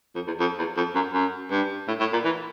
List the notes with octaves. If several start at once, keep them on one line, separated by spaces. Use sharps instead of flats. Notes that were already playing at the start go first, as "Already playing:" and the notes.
F2
E2
F2
E2
F2
F#2
F#2
G2
A2
A2
A#2
E3